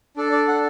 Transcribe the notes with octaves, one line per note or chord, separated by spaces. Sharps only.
D4 A4 D5
D5
F#5